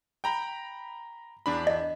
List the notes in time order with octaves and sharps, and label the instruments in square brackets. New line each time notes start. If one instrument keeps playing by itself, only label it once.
[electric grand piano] G5 A#5 B5
E2 D4 B5
[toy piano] D#5